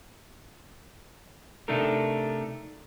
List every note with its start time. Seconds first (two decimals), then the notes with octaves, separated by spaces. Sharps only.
1.68 C3 A3 D4 D#4 A4 A#4